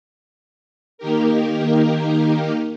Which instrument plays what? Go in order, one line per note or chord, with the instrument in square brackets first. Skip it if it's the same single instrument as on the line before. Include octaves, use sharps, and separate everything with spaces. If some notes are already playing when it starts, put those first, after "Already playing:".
[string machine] D#3 A#3 D#4 G4 A#4